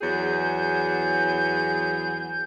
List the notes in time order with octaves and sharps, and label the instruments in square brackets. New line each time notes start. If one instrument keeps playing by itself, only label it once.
[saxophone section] E2 F#3 G#4 [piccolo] G6